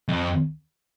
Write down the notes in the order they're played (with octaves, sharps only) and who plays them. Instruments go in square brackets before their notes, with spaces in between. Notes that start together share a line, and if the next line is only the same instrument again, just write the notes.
[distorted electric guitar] F2